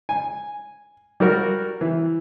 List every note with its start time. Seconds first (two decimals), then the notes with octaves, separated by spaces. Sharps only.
0.09 G#5
1.20 G3 F#4 A#4
1.81 E3